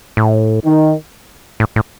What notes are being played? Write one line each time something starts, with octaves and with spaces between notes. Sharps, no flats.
A2
D#3
A2
A2